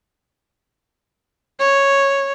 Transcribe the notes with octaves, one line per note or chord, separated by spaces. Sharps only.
C#5